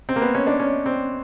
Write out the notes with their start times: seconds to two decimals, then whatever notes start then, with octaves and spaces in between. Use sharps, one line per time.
0.09 C4
0.16 A#3
0.22 B3
0.35 C#4
0.47 D4
0.60 C#4
0.86 C4